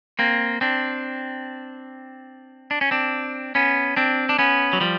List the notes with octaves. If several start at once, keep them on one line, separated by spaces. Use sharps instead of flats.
A#3 C4
C4 D4
D4
C#4
C4 D4
B3 C#4
C4 D4
D4
B3 C#4
F#3
F3 G3